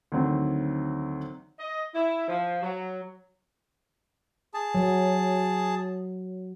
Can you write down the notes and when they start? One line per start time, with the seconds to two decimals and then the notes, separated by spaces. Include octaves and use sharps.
0.12 D2 D#3 F#3 C4
1.60 D#5
1.94 E4
2.28 F3
2.62 F#3
4.54 G#4 A5
4.75 F#3